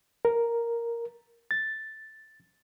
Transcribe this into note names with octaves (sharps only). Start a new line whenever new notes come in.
A#4
A6